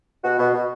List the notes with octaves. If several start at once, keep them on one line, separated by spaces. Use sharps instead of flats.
B2 F#4
B2
B2